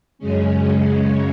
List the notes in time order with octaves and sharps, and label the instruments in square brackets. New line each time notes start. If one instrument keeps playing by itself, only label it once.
[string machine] F#2 C#3 G#3 C#4